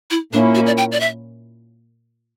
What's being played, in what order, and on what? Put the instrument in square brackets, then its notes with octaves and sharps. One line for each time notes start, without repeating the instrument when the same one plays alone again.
[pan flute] E4
[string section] A#2 A#3 C#4 E4 [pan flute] D4
[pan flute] F#4
D5
G5
D5
E5